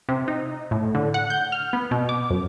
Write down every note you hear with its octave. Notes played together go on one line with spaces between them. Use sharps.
C3
D#4
A2
D3
F#5
G6
F6
B3
B2
D6
F#2